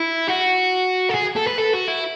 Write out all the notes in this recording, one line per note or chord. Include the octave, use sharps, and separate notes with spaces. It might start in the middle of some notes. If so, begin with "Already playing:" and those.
Already playing: E4
F#4
A4
G#4
A4
B4
A4
F#4
E4